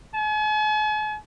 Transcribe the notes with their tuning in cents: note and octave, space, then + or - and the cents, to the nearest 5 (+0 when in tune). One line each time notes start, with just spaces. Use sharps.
G#5 +45